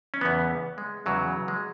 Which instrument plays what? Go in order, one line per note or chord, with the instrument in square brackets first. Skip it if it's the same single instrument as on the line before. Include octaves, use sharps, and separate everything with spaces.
[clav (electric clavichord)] C#4
E2 C#3 E3 B3
G#3
E2 C#3 E3 F#3
G#3